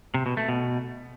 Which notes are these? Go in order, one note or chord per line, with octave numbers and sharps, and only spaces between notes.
C3
B2
A3
B2